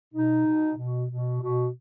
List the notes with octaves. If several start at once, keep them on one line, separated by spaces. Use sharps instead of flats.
B2 D#4
B2
B2
B2
B2